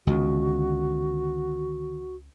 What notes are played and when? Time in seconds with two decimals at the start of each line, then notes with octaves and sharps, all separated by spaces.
0.07 C#2 D3 D#3 B3 F#4